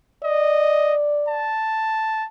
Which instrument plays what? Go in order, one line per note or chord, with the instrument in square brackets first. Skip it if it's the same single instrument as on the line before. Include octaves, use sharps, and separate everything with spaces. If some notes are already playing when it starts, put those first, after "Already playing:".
[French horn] D5 [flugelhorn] D#5
[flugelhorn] A5